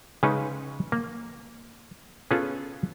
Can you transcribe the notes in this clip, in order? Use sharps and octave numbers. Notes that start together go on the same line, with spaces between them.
C#3 G#3 C#4 D#4 B4
A#3
B3 C#4 F4 G#4 A4